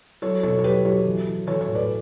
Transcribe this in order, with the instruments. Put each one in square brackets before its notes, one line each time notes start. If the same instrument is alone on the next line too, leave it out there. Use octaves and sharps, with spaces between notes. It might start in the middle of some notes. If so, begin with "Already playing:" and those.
[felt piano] F#3 A4 C#5
B2 A4 C#5
C#5
F#3 G4 B4
F#3 A4 C#5
E3
E3
E3 A4 C#5
A4 C#5
A2
B4 D5